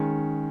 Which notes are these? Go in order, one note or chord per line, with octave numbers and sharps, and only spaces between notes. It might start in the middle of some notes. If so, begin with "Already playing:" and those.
Already playing: D#3 G#3 C#4